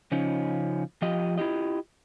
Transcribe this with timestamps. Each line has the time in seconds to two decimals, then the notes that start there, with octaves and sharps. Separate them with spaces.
0.12 C#3 F3 C#4 D#4
1.02 F3 F4 G4 D#5
1.38 E4 F4 G4 D#5